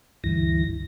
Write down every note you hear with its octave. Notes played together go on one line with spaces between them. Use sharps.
D2 G2 E3 A#6